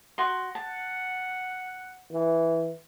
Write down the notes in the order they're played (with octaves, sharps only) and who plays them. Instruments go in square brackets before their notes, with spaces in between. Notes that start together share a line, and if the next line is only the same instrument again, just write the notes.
[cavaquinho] F#4 C6
[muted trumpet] F#5 [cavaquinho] A5
[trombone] E3